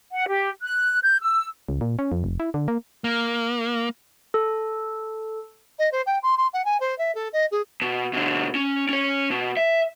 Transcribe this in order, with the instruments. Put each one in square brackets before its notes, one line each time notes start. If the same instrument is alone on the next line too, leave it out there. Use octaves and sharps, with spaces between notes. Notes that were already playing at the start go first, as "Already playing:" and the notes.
[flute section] F#5
G4
F#6
G6
E6
[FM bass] C#2
A#2
C#4
F2
F1
E4
D3
A#3
[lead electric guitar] A#3
[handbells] A4
[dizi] D#5
C5
G5
C6
C6
F#5
G#5
C5
E5
A4
D#5
G#4
[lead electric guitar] B2
B2 D3
C#4
C#4 C#5
B2
E5